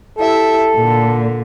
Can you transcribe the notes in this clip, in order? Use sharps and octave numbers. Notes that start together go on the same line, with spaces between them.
E4 G4 A4 E5
A#2 D3